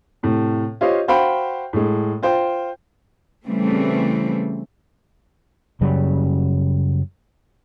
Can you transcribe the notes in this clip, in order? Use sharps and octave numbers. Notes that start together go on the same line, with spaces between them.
A2 C3
F4 G4 C5 C#5 D#5 F5
F#4 C5 F5 G5 B5
A2 G#3
F4 C5 G5
C#3 E3 G3 A3 C4
F#2 C#3 F#3 G3